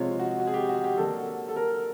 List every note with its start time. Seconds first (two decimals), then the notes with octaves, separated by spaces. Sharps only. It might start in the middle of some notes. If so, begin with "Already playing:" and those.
Already playing: C3 F3 G#3 C4 F4 C#5
0.20 F#4
0.40 F#4
0.47 G#4
0.54 G4
0.69 F#4
0.84 G4
0.98 D3 F#3 A#3 A4
1.49 A4
1.56 A#4